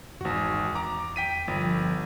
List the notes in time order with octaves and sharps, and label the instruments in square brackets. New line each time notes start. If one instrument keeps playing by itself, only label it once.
[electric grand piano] G#1 F#4 [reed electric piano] E2
[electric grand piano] A#5 D6
G5 B6 D#7
[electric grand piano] G1 [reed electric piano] F3